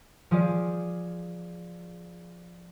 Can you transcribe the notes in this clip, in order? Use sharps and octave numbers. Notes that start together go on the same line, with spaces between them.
F3 G#4 D5